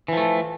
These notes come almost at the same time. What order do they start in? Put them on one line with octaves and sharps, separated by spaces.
E3 F3 A3